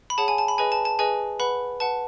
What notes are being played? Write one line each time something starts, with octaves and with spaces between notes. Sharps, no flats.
B5
G#4 C#5 F#5 A5
G#5
A5
B5
G#4 B4 D#5 G#5
A5
A5
G#4 B4 D#5 G#5
B4 F#5 B5
B4 F#5 A5